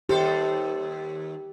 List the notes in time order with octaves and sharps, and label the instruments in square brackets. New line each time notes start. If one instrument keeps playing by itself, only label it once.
[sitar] D#2 A4 C5 [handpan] G4